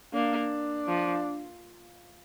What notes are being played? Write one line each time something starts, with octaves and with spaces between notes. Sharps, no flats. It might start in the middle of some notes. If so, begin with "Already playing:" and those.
A#3 D4
F3